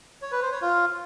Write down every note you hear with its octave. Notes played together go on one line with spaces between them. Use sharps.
C#5
B4
C5
C#5
F4